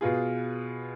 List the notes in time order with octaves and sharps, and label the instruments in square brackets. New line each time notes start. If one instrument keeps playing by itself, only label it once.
[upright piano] B2 B3 F4 G#4